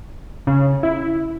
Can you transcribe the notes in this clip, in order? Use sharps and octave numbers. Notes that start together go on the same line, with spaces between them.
C#3
E4